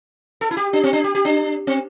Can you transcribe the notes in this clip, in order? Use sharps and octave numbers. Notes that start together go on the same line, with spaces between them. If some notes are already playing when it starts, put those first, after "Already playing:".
A4
E4
G4
D4
C4
D4
G4
G4
D4
C4